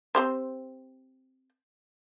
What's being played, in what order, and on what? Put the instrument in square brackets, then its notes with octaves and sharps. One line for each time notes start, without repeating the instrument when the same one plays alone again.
[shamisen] C4 G4 C5